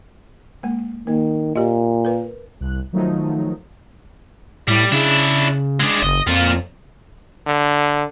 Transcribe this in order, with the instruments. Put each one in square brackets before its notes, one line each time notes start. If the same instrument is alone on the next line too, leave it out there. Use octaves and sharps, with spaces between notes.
[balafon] G#3 A#3
[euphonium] D#3 [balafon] A#3
[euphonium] A#2 [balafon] G4 D#5
[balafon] A#4 B4
[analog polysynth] C2 F#6
D#3 F3 F#3 A3 D#4
[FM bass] A2 [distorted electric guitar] G3
[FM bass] C#3 [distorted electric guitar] D4 E4
[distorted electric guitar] G#3 D4
[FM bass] F#1 [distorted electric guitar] D#5
[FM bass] F2 [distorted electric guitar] A#2 F4
[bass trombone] D3